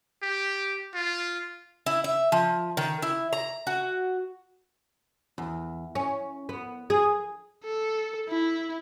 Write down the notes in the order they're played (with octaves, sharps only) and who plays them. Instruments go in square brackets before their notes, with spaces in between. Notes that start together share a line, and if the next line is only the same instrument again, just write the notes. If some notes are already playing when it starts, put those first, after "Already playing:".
[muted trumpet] G4
F4
[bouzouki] E4
E5
F3
D#3
E4
A#5
F#4
[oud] E2
C#4
B3
G#4
[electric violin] A4
E4